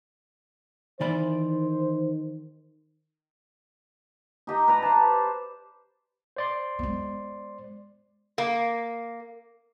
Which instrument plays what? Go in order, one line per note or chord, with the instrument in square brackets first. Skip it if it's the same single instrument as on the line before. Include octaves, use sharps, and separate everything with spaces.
[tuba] D#3 [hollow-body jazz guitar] E3 D5 B5 [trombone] C5
[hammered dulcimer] D#4 G4 D#5
B4 D5 A#5
C5 A5
[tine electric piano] C5 D5 C6
[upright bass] G#3 B3
[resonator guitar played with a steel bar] A#3